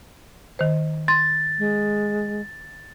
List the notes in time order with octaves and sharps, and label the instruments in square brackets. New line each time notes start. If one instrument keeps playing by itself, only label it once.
[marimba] D#3 C5
[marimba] C6 [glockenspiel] A6
[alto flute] G#3